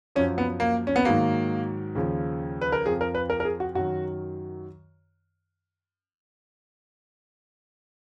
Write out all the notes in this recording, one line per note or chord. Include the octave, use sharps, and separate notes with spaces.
F#2 F3 C#4
B3
A#3
C#4
B3
G#2 D#3 F#3 A#3
D#2 C#3 F3
B4
A#4
F2 F3 G#4
A#4
B4
A#4
A#4
G#4
F#4
F#2 D#3 F#3 F#4